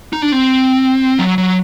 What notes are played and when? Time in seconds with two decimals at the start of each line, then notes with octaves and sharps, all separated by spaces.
0.13 D#4
0.22 D4
0.32 C4
1.19 F#3
1.38 F#3